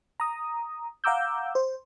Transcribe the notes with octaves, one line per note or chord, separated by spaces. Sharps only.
A#5 D#6
F5 F#5 A#5 D6 E6 G6
C5